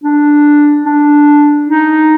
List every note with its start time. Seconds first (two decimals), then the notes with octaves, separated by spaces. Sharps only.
0.04 D4
0.85 D4
1.68 D#4